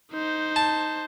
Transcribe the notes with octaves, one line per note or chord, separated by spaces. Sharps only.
D#4 C5
A5